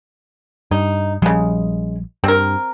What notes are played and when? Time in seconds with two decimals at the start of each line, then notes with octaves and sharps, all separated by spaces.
0.71 G2 D#4
1.22 A#1 C#3 F3 G3 G#3
2.24 G2 C4 A#4